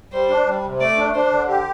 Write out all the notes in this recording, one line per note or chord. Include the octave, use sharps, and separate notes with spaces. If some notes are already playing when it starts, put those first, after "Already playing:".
G3 C5
D4
G3
C3
A3 D5
D4
D4 C5
D3
G4